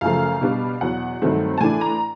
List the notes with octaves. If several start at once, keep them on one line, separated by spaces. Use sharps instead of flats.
F#2 C#3 F3 A3 F5
B2 G3 B3 D4
E2 B2 F#3 F#5
G2 D#3 F#3 A3 C4
A5
A2 E3 A3 D4 G#5
A#5